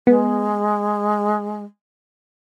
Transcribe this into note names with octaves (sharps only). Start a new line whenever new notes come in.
G#3 B3